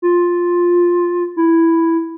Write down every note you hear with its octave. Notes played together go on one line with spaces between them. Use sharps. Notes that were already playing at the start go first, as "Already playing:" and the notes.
F4
E4